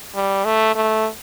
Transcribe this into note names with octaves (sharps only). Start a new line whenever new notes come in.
G3
A3
A3